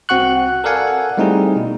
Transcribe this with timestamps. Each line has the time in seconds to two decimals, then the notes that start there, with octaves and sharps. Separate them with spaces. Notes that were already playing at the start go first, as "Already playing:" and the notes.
0.09 C2 C4 F#4 F#5 C#6 F#6
0.64 A4 A#4 D5 F5 F#5 G#5
1.17 G3 A3 C4 D#4 E4 G#4
1.56 B2